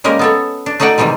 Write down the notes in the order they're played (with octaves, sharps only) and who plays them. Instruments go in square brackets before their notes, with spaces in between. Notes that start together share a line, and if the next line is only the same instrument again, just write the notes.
[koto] G3 G#3 A#3 C#4 A#4
B3 A4 C#5
D4
A3 D#4 F#4 D5 F#5 G5
C3 D#3 E3 G3 G#3